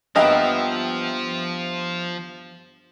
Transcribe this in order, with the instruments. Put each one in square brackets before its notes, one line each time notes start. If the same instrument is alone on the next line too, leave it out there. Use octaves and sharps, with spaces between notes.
[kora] G2 B3 [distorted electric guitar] F3 [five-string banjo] A#3 D#5 [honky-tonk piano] E5 G5 F6